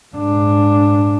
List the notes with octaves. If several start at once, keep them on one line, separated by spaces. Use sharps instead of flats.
G#2 D4